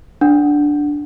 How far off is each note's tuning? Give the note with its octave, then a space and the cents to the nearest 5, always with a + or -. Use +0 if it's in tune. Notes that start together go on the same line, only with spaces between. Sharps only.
D4 +0 F#5 +0